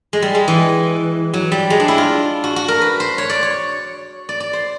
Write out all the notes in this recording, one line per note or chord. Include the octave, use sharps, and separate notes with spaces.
G#3
G3
G#3
E3
F#3
G3
G#3
D4
E4
F4
F#4
F#4
A#4
B4
C5
C#5
D5
C#5
D5
D5
C5